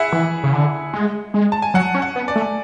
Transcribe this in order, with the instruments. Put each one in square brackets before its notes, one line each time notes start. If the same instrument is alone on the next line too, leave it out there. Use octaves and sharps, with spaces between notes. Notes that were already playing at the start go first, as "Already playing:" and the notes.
Already playing: [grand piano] E4 G#4 E5 F#5
[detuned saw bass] E3
C#3
D3
G#3
G#3
[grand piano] A5
G#5
[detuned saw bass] F#3 [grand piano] F#5
[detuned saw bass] C#4
[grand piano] F#5
[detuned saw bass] B3
[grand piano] D5
[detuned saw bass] A3